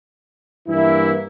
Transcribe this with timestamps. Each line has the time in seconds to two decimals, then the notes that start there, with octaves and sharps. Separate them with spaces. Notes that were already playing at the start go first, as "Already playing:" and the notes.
0.68 G2 E3 A#3 E4